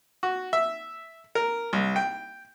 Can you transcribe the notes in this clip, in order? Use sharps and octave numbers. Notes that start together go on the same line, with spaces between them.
F#4
E5
A#4
C2
G5